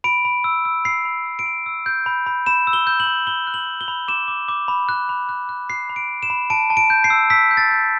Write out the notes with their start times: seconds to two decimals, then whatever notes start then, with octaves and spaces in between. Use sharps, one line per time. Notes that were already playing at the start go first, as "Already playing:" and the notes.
0.04 B5 D7
0.25 B5
0.44 E6
0.65 E6
0.85 B5 C7
1.05 B5
1.26 E6
1.39 D7
1.46 B5
1.66 E6
1.86 G6
2.06 B5
2.26 B5
2.46 B5 E7
2.67 E6
2.73 G7
2.87 G6
3.00 F#7
3.07 B5
3.27 B5 G7
3.47 F#6
3.54 F#7
3.67 B5
3.81 G7
3.88 B5
4.08 D6 E7
4.28 D6
4.48 D6
4.68 B5
4.89 F#6
5.09 B5
5.29 F#6
5.49 F#6
5.70 F#6 C7
5.90 B5
5.96 D7
6.09 F#6
6.23 E7
6.30 B5
6.50 A5 D7
6.70 A5
6.77 D7
6.90 G6
7.04 C7
7.10 E6
7.30 E6 B6
7.51 G6
7.57 A6
7.71 G6